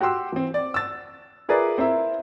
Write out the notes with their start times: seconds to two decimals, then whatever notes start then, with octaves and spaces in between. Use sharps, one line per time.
0.01 F#4 G4 G5 C6 E6
0.32 E3 C4
0.54 D5
0.74 E6 A6
1.49 F4 G#4 A#4 B4 D5 E5
1.78 C4 E4 A#4 E5